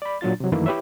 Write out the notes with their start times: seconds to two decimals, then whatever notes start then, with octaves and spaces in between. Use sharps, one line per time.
0.02 D5 B5
0.21 A#2 F#3 D4 F4 A6
0.40 C3 F#3
0.52 F#2 D#3 E3 A3 A#3 E4
0.66 E4 G4 B4 C#5 E5